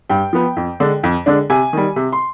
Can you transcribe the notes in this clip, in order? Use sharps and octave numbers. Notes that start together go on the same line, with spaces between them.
G2 G5
F3 B3
F2
D3 G#3 D4
F2
D3 G#3 D4
C3 G#5
D#3 G3
C3
C6